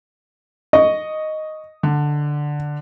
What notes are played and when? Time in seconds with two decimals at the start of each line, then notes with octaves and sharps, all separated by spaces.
0.73 D#5 C#6
1.83 D3